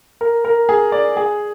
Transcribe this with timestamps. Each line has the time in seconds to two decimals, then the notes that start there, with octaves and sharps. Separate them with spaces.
0.21 A#4
0.45 A#4
0.69 G#4
0.92 D5
1.17 G#4